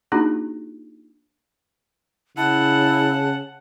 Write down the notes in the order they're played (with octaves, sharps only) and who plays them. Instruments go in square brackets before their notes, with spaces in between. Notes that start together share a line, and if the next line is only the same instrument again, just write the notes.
[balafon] A#3 D4 D#4 F4 F#4 G#4
[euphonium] C#3 [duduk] E4 [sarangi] F#5 [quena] A5